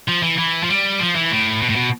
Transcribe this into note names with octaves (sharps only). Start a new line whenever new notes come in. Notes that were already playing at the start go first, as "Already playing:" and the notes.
F3
E3
E3
F3
G3
F3
E3
A2
B2
A2
B2